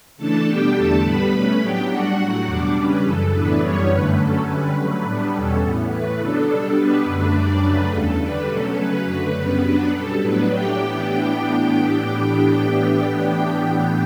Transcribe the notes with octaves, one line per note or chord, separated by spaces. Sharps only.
C#3 E3 A3 D4 A4 A5
B2 G3 B3 D4 G4 G5
E2 D3 A3 A4 A5
A2 G3 B3 B4 B5
B2 A3 C#4
A2 F#3 B3 D4 G4 G5
A2 G3 D4 F#4 F#5
A2 F#3 A3
E2 B2 G3 D4 D5
C#3 G3 C#4 B4
F#2 C#3 E3 A4
A2 E3 B3 D4 B4
F#2 E3 G3 B3 C#4 D4 C#5
G2 D3 A3 C#4 B4
D3 F#3 A3 C#4 A4
D3 G3 C#4 B4
C#3 F#3 A3 B4
A2 G3 B3 D4 B4
E2 B2 G3 C#4 A4
A2 E3 B3
A2 E3 A3 B4
C#3 F#3 B3 D4 A4
B2 G3 D4 A4
B2 G3 B3 D4 B4
F#2 D3 A3 D4 B4
F#2 C#3 G3 D4 D5
F#2 C#3 F#3 A3 D4 B4
E2 C#3 G3 A4
D3 G3 D4 B4
B2 F#3 A3 C#4 A4
C#3 F#3 C#4 B4
F#2 D3 F#3 A3
F#2 C#3 G3 B3
C#3 F#3 B3 D4 B4
B2 G3 C#4 A4
A2 F#3 B3 D4 B4
A2 F#3 A3 D4 G4 G5
A2 E3 B3 D4 G4 G5